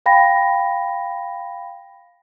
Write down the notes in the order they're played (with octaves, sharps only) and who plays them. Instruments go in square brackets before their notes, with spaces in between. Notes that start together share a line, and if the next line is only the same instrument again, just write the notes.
[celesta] F5 G5 B5 A#6